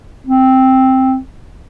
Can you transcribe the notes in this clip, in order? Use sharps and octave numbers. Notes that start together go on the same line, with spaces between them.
C4